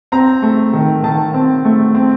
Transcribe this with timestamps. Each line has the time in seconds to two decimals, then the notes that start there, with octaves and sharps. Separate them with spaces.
0.12 C4 A#5
0.42 A3
0.73 D#3
1.03 D#3 A5
1.34 C4
1.65 A3
1.95 C4